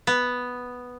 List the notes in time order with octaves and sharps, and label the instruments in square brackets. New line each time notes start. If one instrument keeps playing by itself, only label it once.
[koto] B3